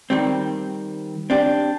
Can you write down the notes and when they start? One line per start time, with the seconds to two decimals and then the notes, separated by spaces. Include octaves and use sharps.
0.10 D#3 G3 C4
1.30 C4 D4 G4